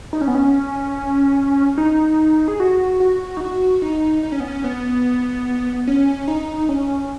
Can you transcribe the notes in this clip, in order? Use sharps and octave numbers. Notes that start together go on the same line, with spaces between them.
D#4
C#4
B3
C#4
D#4
G#4
F#4
F#4
D#4
F#4
D#4
D#4
C#4
B3
C#4
B3
C#4
D#4
C#4